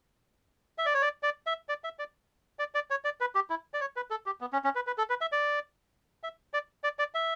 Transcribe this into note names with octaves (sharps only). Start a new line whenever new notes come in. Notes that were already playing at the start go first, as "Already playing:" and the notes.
E5
D5
C#5
D5
D5
E5
D5
E5
D5
D5
D5
C#5
D5
B4
G4
E4
D5
C#5
B4
A4
G4
B3
C#4
C#4
B4
B4
A4
B4
E5
D5
E5
D5
D5
D5
E5